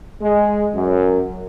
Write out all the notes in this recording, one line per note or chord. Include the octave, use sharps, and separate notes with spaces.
G#3
F#2